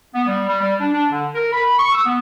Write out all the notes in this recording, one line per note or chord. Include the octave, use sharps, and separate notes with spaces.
B3
G3
G3
G3
D4
D4
D3
A#4
B5
C#6
E6
B3